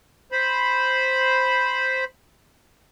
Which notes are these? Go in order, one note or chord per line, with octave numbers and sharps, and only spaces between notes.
C5 B5